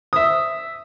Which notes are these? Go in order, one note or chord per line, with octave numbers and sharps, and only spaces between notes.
E5 D#6